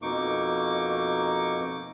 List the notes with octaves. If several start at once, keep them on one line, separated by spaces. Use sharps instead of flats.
F2 B2 A#3 D#4 C#6 D6